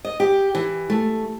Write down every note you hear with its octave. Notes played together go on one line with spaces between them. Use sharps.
D#5
G4
E3
A3